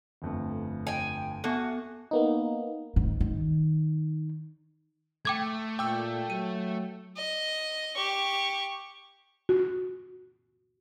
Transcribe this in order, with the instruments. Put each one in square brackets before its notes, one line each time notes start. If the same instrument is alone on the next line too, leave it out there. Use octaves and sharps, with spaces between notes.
[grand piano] G1 F2 A3
[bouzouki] G5 G#5
[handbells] B3 A4 [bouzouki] F#4 [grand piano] G#5 A5
[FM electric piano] A#3 B3 D#4
[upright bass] G#2
D#3
[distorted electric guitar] A3 [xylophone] G5 D6 G#6
[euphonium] A#2 [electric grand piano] G5 E6 [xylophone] D6
[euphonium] F#3 [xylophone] D#7
[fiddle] D#5
G4 C#6
[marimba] F#4